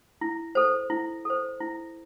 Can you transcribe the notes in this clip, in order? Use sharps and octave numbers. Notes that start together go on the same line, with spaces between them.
E4
A4 C5
E4
A4 C5
E4